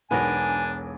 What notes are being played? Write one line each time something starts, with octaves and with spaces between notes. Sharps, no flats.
E1 B1 B3 D4 A#4 G#5